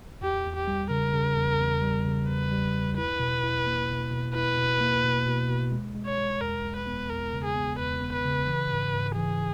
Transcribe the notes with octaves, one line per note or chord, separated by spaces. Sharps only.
E2 G4
E2
G4
G3
C#3 A#4
C#3
E2
E2
G3
C#3
E2 B4
G3
E2
E4 B4
B2
E4
A#3
B2
B2
E4 B4
B2
A#3
B2
B2
B2
G#3
G#3
C#5
G#3
E2 A#4
G#3
B4
B3
E2 A#4
C#3
G#4
B3
E2 B4
B3
B4
C#3
E3
G#2
G#2
E3 G#4